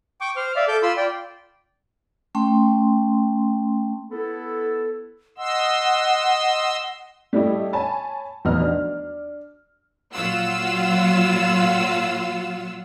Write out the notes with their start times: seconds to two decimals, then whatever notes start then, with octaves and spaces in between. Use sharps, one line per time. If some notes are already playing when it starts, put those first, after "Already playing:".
0.21 G5 C#6 D6
0.36 C5 F6
0.56 D5 E5 F5
0.68 A4 D6 G6
0.83 F4 B5 C6 E6
0.97 D5 G5
2.35 A3 C#4 G5 C6
4.11 B3 E4 A4
5.38 D#5 F#5 C6 E6
7.33 G3 A3 E4 G4 D#5
7.73 C#5 G#5 A5 B5
8.45 F1 B1 E2 B3 D#5 F6
8.60 D4
10.14 A#2 F#3 F4 F5 F#5 E6